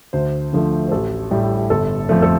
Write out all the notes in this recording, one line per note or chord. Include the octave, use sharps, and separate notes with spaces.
D2 C5
D3 F3 A3
C5
A1 A4
A2 G3
G1 A4
F2 F3 A3
A4